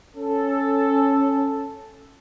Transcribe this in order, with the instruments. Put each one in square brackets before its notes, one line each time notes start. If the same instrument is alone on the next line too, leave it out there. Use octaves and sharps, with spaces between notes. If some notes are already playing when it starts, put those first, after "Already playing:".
[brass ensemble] C#4 A4